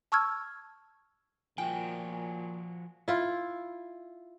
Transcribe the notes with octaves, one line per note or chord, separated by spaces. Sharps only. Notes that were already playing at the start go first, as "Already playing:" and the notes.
A5 C#6 E6 F6 G#6
A#2 F3 F#4 G5 G#5
E4 F4